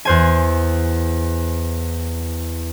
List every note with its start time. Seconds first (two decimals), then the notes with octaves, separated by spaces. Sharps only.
0.05 E2 C5 G#5